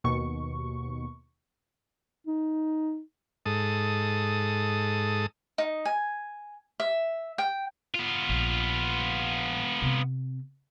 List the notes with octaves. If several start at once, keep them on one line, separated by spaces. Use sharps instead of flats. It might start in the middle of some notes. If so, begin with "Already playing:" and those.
D#2 B2 C#6
D#4
G#2 A4 D#6
D#4
G#5
E5
G5
B3 F4
A#1
C3 C4